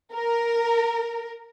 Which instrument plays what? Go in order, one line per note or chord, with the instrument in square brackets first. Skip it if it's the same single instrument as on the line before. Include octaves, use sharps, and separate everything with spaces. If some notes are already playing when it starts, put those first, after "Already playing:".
[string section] A#4